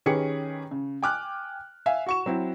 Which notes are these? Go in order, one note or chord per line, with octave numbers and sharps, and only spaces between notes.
D#3 C#4 G4 G#4 B4 C#7
C#3
G5 G#5 D6 F6 F#6
E5 F5 G#5
F#4 C#6 E7
F#3 C4 E4